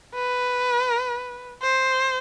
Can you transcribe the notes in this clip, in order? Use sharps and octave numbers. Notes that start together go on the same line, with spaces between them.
B4
C5